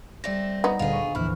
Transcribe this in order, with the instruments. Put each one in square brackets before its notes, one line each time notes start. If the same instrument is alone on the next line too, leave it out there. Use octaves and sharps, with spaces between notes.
[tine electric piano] G3 D5 A#6 [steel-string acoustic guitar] A3 C4
[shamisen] B3 D#4
[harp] D2 A#2 [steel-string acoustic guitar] F4 G#4
[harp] B5 C#6
[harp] A#1 E2 [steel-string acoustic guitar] E4 [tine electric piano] B5 F6